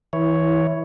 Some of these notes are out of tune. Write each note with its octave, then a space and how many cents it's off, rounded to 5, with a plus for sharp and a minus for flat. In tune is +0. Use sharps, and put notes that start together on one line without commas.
E3 -20 E4 +0 C#5 +5